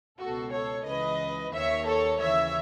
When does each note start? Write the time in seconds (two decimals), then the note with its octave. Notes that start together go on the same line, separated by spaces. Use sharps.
0.18 C#2 B2 F#4 A4
0.51 A4 C#5
0.85 C#2 C#3 E3 B4 D#5
1.53 D#2 D#3 C#5 E5
1.86 A4 C#5
2.20 D#2 C#3 E3 C#5 E5